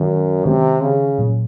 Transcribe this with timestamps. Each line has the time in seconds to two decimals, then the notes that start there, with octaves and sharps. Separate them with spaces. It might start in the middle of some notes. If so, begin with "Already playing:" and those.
Already playing: F#2 D#3 G#3
0.46 C3 D#3 G#3 C#4
0.82 C#3
1.18 A#2 F#3 A#3